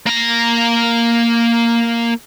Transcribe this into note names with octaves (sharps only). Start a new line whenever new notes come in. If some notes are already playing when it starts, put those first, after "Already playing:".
A#3 A#5